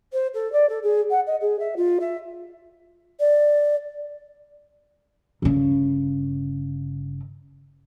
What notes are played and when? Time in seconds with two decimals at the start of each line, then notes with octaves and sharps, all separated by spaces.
0.12 C5
0.34 A4
0.52 D5
0.69 A4
0.82 G#4
1.10 F#5
1.26 D#5
1.41 G#4
1.59 E5
1.76 F4
2.00 E5
3.20 D5
5.42 G1 C#3